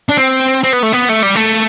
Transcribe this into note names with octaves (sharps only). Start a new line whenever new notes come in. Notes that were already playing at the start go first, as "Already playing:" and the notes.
D4
C4
C4
B3
A3
B3
A3
G3
A3